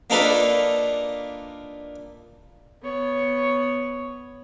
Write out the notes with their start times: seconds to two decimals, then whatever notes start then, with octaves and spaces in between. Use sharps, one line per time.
0.10 A#3 D4 D#4 F4 A4 B4
2.83 B3 C#5